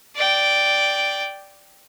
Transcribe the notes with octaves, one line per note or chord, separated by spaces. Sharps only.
D5 G5